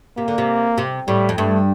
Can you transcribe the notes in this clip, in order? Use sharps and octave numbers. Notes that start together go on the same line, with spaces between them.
C3 A#3
D3
C3
C3
A2 G3
F2
G2 A3